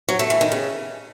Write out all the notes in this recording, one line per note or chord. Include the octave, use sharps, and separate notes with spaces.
F#3
A3
E3
D#3
C#3